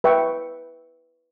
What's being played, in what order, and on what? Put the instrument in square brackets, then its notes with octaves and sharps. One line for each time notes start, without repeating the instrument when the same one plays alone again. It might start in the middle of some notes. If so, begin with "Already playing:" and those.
[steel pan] B4 E5 G5 C#6